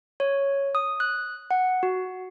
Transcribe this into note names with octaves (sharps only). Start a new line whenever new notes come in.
C#5
D#6
F#6
F#5
F#4